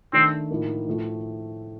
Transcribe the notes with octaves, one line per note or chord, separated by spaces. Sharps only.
D#3 A3 C4 D4
A2 F3 A#3 D#4
A2 F3 A3